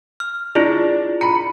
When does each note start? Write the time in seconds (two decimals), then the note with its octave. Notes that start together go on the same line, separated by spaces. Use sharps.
0.20 F6
0.55 D4 E4 F4 G#4
1.21 A#5 B5 C#7